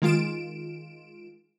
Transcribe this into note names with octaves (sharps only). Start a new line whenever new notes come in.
D#3 G#3 F4 D7 E7